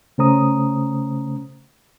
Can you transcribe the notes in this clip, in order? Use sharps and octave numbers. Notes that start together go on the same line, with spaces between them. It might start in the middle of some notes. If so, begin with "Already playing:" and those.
C#3 A3 C#4 C5 A#5 D#6